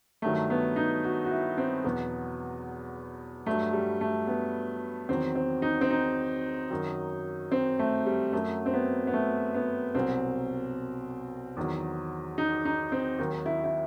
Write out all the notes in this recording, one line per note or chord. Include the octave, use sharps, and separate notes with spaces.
G2 D#3 F#3 A3
B3
D#4
F#4
F#4
E4
C4
E2 B2 F#3 B3
G2 F#3 A3
G3
A3
B3
E2 D#3 F#3 C4
C4
D#4
C4
D#4
F#2 D#3 F#3
C4
A3
G3
F#2 F#3 A3
C4
B3
B3
A3
B3
C2 B2 F#3 C4
E2 D#3 F#3
D#4
D#4
C4
D#2 D#3 F#3
E4
E4